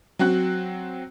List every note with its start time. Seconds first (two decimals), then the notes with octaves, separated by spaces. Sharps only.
0.19 F#3 C4 F#4 F#6